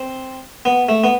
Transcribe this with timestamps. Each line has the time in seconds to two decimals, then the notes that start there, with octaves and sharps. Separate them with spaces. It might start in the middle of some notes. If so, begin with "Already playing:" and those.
Already playing: C4
0.65 B3
0.89 A3
1.04 B3